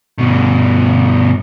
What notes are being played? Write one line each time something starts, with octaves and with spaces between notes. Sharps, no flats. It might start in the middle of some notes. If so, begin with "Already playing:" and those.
G2 B2